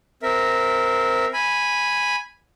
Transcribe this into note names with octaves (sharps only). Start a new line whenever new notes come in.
C4 A#4 E5
G#5 B5